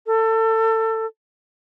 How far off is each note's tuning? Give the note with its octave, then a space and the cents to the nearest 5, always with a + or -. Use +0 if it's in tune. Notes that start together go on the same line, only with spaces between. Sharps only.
A4 +25